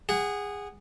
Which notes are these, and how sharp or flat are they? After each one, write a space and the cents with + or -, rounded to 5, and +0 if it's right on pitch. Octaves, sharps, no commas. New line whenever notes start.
G#4 -20 F#5 +10